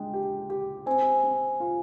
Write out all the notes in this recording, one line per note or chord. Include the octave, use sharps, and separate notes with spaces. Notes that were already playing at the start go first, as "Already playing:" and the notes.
Already playing: G#3 D4 G5
G4
G4
C4 G#5
C4
F4